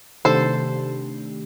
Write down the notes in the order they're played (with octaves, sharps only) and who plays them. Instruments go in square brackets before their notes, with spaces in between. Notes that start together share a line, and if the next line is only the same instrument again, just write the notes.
[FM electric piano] C3 D#3 A3 D4 G4 [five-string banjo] A4 C5